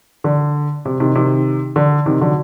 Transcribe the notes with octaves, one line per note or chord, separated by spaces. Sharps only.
D3
C3
C3 D#3
C3 D#3
D3
C3 D#3
D3 F#3